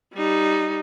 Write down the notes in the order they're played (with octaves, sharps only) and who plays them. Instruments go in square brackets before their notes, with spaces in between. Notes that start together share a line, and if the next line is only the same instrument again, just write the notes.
[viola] G3 D#4